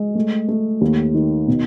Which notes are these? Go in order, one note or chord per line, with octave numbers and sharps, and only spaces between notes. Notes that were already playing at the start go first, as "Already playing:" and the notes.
Already playing: G#3
A3
A3
D#2
D#3
B2